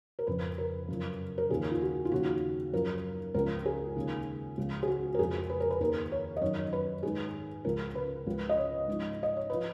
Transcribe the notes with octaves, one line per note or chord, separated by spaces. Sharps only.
A#4
F2 C#3 F3 B4
A#4
F#2 C#3 F3
A#4
D#2 C#3 F3 G#4
F4
F#4
F4
D#2 C#3 F3 F#4
F#2 F3 A#4
C#2 C#3 F3 A#4
G#4
D#2 C#3 F3
C#2 C#3 F3
G#4
F#4
A#4
F2 C#3 F3 G#4
B4
A#4
B4
D#2 D#3 A#4
C#5
D#5
F#2 D#3 C#5
B4
G#2 D#3 G#4
C#2 C#3 F3 A#4
B4
C#2 C#3 F3
D#5
C#5
G#2 F3
D#5
C#5
F3 B4